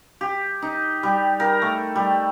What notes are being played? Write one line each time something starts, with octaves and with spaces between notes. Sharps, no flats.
G4
D#4
G3
A#4
A3
G3